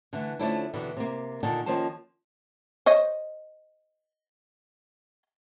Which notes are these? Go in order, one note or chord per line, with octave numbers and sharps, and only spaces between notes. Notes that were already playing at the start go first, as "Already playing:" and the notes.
D3 E3 A3
D3 F3 A3 C#4 D4 E4
D#2 B2 D3 E3
C3 A#3
A#2 D3 D#3 A5
D#3 F3 A#3 C#4 C5 A5
C5 C#5 D#5